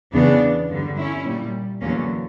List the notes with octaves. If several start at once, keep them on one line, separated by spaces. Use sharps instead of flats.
E2 C#3 E3 B3 D4
G2 D3 G3
C#4 E4
A#2 G3
E2 D3 F#3 A#3 C#4